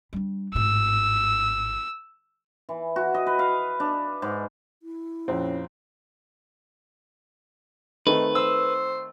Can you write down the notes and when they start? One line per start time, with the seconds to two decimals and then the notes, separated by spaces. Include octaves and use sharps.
0.13 G3 D4
0.55 G#1 A2 E6
2.69 E3
2.96 F#4
3.14 D#5
3.26 B4
3.39 F5
3.80 D4
4.22 G#2
4.83 E4
5.28 A#1 F2 C4 C#4
8.07 D#3 A3 C4 D#4 B4
8.35 C5 E6